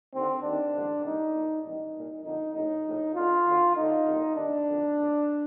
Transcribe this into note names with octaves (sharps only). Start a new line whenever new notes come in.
D#2 D3 C4
D#2 D#3 D4
A1 G2 D3
C2 A#2 D#4
A#1 A#2
A1 G2 D#3 D#4
C2 A#2
F2 D3 D#4
A#1 A2 D#4
A#1 A2
D2 D3 F4
D2 D3
D2 D3 D#4
C2
A#2
D#2 D#3 D4
F2 D3
A#1 A2